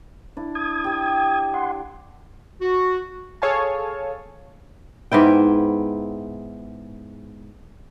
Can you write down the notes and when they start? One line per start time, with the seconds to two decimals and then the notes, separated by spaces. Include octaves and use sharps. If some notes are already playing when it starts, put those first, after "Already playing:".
0.37 D4 E4
0.55 D#6 G#6
0.84 G4 G5
1.54 F#5 C6
2.61 F#4
3.42 G#4 A4 C#5 F5 G#5 A5
5.12 G#2 B3 E4 G5